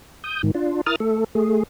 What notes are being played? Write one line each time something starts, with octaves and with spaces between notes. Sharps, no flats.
D#6 G6
G#2 D#3
D4 F4
E4 A#4 D#6 F6 A6
A3 A4
A3 G#4